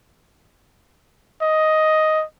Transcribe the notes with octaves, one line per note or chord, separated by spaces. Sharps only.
D#5